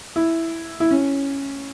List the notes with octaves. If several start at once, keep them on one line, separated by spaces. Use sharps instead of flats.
E4
E4
C#4